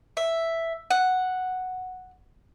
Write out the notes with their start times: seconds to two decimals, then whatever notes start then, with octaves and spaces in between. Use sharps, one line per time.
0.17 E5
0.90 F#5